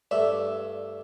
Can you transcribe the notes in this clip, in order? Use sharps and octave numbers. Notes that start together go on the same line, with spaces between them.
G2 A3 D5 E5